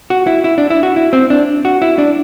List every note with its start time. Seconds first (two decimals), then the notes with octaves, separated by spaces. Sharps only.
0.10 F#4
0.27 E4
0.44 E4
0.58 D4
0.70 E4
0.83 F#4
0.96 E4
1.13 C4
1.30 D4
1.65 F#4
1.82 E4
1.98 D4